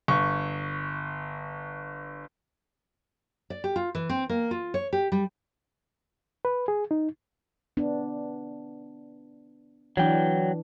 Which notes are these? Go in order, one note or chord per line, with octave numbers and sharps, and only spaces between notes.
G1 C#6
D5
G4
F4
E3
C4
A#3
F4
C#5
G4
G3
B4
G#4
D#4
B3 D4
E3 F#3 D4 G5